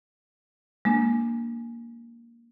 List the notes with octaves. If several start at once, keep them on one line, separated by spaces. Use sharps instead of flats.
G#3 A#3 D4